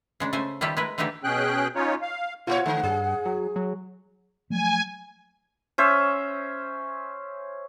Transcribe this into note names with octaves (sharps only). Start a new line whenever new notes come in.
C#3 G#3 D4
C#3 A3 C5 G#5
D#3 G3 A3 E4 F4 G4
G#3 E4 A#4 B4
D3 E3 A3 D#4 G4 G#4
B2 C#4 G#4 G5 F#6
C#4 D#4 F4 C#5
F5
A#2 F4 A#4 C#5 F#5
D3 A3
G2 G#4
F#3
F#3
F3 F#3 A3 G#5
C#4 C5 E5